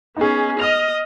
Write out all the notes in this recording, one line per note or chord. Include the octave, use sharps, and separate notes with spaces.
B3 C#4 D#4 G#4
D#5 D#6 F6 F7